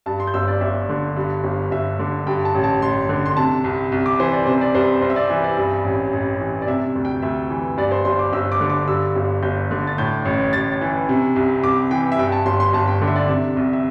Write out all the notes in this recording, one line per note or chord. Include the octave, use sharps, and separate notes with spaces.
G2 A5
C6
G6
G1 E6
D5
G1 E5
D3
G2
G1
G1 E5
D3
G2 G5
A5
A1
A5
A1 C6
D3
C6
C3 A5
C2
C2
D6
E3 C5
D5
C3 C5
D5
C2 C5
C2 C5
E5
D5
E3 E5
D5
G2
A1
A1
E3
D5
C3 E5
D2
G5
D2 E5
E3
G2 D5
C5
G1 C6
D6
G1 E6
D6
D3
D6
G2 E6
G1
G1 G6
D3
A6
A2 G6
A1
A1 A6
E3
C3
C2
C2 D6
E3 G5
E5
G2 G5
A5
G1 C6
C6
G1 A5
G5
D3
E5
D5
C3 E5
C2
E5